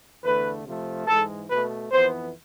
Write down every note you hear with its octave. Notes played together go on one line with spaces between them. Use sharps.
E2 D3 A3 B4
C3 F3 A3
G#2 E3 G#3 A4
B2 A3 B4
F2 E3 B3 C5